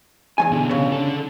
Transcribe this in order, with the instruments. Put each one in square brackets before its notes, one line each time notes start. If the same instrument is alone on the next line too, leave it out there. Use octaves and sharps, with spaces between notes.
[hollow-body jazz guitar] E2 F#3 G#5
[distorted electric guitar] B2 D3
[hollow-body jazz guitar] C#3
[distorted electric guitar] D3 A4